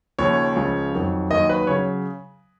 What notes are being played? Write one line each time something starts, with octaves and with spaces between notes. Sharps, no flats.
D#2 C#3 F3 C#5
C#2 C#3 F3
F2 D#3 F#3
D#2 D#3 F#3 D#5
B4
C#3 F#3 C#5